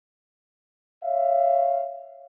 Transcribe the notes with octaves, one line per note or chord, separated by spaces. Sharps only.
C#5 E5 F5